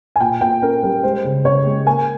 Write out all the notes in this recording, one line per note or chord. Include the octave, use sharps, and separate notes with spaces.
G#5
A#2 G5
A#2 G5
C#4 A#4
G3 A#4
G#3 C5
C#3
C#3 C#5
G#3
A#3 G#5